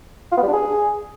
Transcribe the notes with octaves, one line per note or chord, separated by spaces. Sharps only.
F4
B3
G3
D4
G#4